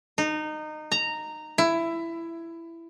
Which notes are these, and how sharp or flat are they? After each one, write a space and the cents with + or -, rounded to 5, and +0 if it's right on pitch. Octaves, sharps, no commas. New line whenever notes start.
D#4 -20
A#5 -10
E4 +15